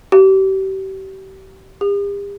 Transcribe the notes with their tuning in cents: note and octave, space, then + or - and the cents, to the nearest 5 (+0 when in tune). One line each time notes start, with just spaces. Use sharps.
G4 -35
G4 +45